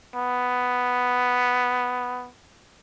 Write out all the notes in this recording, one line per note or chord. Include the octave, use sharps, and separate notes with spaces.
B3